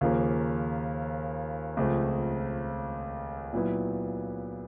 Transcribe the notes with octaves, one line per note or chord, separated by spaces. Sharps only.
D#2 C#3 F3 A#3
C#2 C#3 F3 A3 C4
A#2 F#3 B3 E4